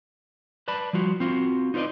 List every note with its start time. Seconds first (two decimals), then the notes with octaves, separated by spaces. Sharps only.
0.68 B4 D5 A5 B5
0.93 F3 G3 F4 F#4
1.20 C4 F4 F#4
1.74 D#4 F4 B4 D5 D#5